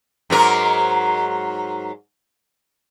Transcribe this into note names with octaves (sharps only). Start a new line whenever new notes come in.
G#2 F#3 A#4